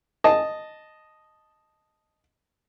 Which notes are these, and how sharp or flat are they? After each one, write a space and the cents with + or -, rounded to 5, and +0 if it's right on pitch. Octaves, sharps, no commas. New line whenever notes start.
D#5 -5 A5 +0